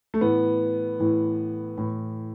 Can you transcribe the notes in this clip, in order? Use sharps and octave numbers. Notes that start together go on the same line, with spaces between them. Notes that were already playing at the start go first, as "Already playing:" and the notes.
A3
A2 E3 B3
A2 E3
A2 E3